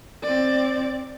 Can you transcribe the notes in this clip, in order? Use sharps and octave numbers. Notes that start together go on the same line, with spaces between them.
C4 D5